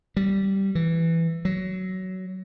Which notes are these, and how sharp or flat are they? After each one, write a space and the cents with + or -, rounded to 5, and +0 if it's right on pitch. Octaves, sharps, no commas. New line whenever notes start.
G3 -10
E3 +5
F#3 +15